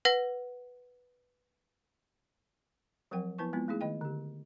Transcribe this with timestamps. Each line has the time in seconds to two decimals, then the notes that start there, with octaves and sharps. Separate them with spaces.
0.05 B4 F#5 A#6
3.11 F3 F#3 C4 A#4 F#5 G5
3.38 F3 B3 E4 B4 A5 C#6
3.53 G#3 B3 C4 E4 F4
3.68 A3 D#4 E4 G#4
3.81 D#3 D#5 G5
4.01 D3 G4